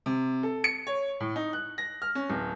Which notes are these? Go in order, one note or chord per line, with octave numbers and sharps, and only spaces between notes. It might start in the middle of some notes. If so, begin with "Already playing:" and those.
C3
A4
C#7
C#5
A2
D#4
F#6
A#6
F6
C#4
D1